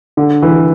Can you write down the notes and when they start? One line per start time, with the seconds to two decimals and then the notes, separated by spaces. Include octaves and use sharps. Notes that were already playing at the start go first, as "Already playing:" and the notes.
0.17 D3
0.43 E3